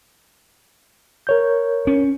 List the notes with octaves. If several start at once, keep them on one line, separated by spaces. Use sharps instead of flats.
A#4 C#5 G6
C#4